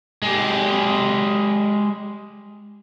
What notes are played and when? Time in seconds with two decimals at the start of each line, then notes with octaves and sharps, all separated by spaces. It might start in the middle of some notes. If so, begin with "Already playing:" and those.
0.22 G#3 G4